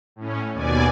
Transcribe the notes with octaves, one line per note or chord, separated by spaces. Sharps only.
A2 C#4
D#2 B2 D5 G#5